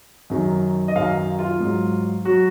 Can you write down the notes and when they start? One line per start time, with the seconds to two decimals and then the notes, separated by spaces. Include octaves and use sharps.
0.30 F#2 D#3 F#3
0.88 D#5
0.96 F#2 D#3 F#3 F5
1.39 F4
1.60 G#2 F#3
2.25 F#3 F#4